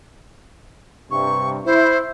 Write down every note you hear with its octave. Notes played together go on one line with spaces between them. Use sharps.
G2 C3 C#6
E4 C5